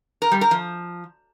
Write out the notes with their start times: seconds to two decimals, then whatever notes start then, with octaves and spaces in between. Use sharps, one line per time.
0.22 A#4
0.32 G3
0.41 A#4
0.51 F3